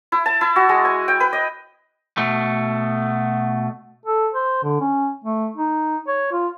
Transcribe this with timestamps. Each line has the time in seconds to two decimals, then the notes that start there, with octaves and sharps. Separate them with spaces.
0.12 E4
0.26 A5
0.41 E4
0.56 F#4
0.69 G#3
0.85 G#5
1.08 G5
1.20 B4
1.33 D#5
2.17 B2 A3
4.06 A4
4.33 C5
4.63 D3
4.80 C#4
5.25 A3
5.57 D#4
6.08 C#5
6.32 F4